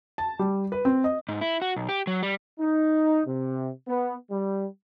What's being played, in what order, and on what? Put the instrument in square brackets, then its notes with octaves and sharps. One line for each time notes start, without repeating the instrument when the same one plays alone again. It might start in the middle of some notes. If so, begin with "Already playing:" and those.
[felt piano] A5
G3
B4
C4
D#5
[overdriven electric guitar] G#2
E4
F#4
B1
G4
F#3
G3
[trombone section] D#4
C3
B3
G3